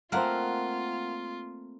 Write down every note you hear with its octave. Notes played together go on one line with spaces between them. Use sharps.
A3 A#3 C4 F4 A#4 F5 F#5